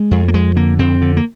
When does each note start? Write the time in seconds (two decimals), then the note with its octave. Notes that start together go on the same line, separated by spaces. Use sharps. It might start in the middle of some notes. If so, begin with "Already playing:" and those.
Already playing: G#3
0.11 F2
0.28 A#3
0.34 F2 G#3
0.56 D3 A#3
0.79 F2 C4
1.01 D3
1.17 A#3